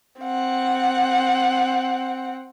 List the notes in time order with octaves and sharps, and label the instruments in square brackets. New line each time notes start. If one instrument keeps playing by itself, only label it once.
[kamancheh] C4 F#5